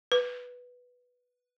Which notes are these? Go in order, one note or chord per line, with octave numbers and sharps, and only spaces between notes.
B4